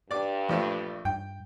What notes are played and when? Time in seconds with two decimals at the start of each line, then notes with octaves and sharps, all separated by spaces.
0.11 G2 D5 D6
0.49 A#1 F3 A3
1.05 G2 G5